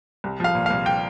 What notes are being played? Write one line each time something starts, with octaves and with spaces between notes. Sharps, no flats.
C2
F3 F5
A#2
F5
C2
G5